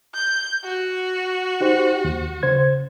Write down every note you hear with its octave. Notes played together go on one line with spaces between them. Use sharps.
G6
F#4
D#4 G4 C5
D#2
C#3 C5 G#6